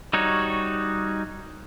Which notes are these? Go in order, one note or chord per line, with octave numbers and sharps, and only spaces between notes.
G3 D#4 F#4 C#5